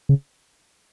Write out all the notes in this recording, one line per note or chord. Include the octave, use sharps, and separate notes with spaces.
C#3